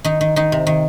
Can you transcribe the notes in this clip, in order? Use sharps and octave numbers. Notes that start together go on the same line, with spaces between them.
D#3 D#4
D#3
D#3 D#4
C3
D#3